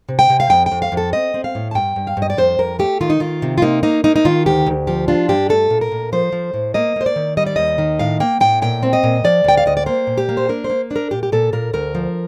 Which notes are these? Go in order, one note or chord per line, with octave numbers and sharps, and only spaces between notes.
C3
G5
C3
F5
F2 G5
G5
F2
F5
F2
A4
C4 D#5
C4
F5
A2
A5
G2 G5
G2
F5
G2
D#5
D5
F2 C5
F2 A#4
A3 G4
D#3 F4
D#4
D#3 F4
C3
F4
A#3 D#4
A#3 D#4
A#3 D#4
D#4
D#3 F4
D2 G4
D2
F3 G4
D4 F4
G2 G4
A3 A4
A#2
A#4
A#2
F3 C5
F3
A2
A#3 D#5
A#3 C5
D5
D#3
G3 D#5
D5
D#2 D#5
D#3
A2 F5
A#3 G5
A2 G5
A#2 G5
C4
D#5
A#2
F3 D5
D2 G5
F5
D2 D#5
D5
A#3 C5
A#2
G4
A#3
C5
D4 A#4
C5
A#3
D4 A#4
A#2 G4
G4
A#2 A4
A#2 A#4
D2 A#4
F3